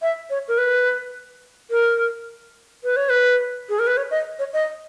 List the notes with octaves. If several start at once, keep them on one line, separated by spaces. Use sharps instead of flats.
E5
C#5
A#4
B4
A#4
B4
C#5
B4
G#4
A#4
B4
C#5
D#5
C#5
D#5